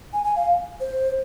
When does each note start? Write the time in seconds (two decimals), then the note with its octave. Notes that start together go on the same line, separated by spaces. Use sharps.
0.13 G#5
0.24 G#5
0.36 F5
0.80 C5